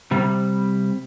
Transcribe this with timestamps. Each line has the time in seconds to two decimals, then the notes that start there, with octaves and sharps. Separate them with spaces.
0.11 C3 G3